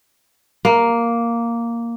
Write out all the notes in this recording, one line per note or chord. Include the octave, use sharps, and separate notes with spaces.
A#3